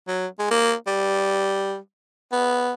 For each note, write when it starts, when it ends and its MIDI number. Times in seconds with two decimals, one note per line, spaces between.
0.08 0.27 54
0.39 0.49 56
0.50 0.73 58
0.87 1.77 55
2.32 2.72 59